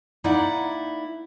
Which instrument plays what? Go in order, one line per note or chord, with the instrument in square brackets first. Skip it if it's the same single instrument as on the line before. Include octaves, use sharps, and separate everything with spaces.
[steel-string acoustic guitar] A#3 D#4 E4 D5 F#5